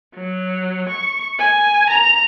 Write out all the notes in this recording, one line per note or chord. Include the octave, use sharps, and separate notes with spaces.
F#3
C#6
G#5
A#5